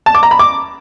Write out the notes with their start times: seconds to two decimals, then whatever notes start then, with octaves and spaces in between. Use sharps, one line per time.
0.06 A5
0.15 D6
0.23 A#5
0.31 B5
0.39 D6